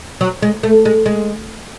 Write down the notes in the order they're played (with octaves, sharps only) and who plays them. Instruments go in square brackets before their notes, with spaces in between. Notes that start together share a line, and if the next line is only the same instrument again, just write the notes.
[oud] F#3
G#3
A3
G#3
G#3